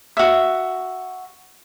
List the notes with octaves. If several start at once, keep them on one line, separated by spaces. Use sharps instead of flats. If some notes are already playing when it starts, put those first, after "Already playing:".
F#4 E5